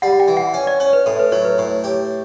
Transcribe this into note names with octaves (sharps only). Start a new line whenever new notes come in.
G3 F#5
G5
E3
F#5
C#4
D5
C#4 C#5
B4
A2 A4
B4
F#3 C#5
B4
A2
G4